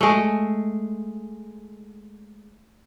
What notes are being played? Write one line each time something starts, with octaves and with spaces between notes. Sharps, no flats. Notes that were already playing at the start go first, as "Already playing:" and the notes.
G#3 A3